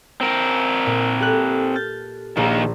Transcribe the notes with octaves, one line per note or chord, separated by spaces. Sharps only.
C4 A#4
A#2
G4 A4 F#6
F6 G6 A6
A#1 D#3 A#3